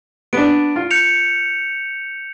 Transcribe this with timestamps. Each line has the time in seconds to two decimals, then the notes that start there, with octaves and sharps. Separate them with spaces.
0.33 B3 D4 D7
0.76 F4
0.91 G6 C#7 F7